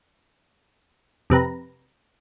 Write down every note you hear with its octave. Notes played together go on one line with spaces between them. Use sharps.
F2 C3 B4 A#5